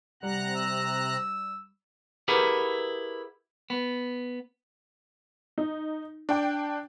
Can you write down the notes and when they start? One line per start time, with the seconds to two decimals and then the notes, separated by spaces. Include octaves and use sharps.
0.23 C3 G3 F#5 A#5 F#6
0.56 E6
2.28 E4 G4 G#4 A#4 B4 F#5
3.70 B3
5.58 D#4
6.29 D4 D5 G5